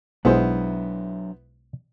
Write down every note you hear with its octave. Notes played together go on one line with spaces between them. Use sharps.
B1 F#3 G#3 B3 D4 E4 C5 D#5